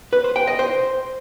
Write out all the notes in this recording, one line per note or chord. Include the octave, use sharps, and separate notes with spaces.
B4
C5
G5
D#5
C5